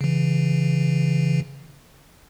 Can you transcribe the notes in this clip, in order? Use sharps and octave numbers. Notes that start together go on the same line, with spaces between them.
C#3 E3